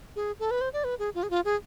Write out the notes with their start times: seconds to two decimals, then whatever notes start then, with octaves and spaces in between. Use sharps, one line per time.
0.16 G#4
0.40 A4
0.51 B4
0.61 C5
0.73 D5
0.84 B4
0.99 G#4
1.15 F4
1.23 G#4
1.30 F4
1.45 G#4